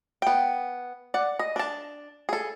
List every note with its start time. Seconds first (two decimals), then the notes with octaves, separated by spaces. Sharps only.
0.22 B3 G5
1.14 D5 F#5
1.39 D#5
1.56 D4 A5
2.29 G#4 A4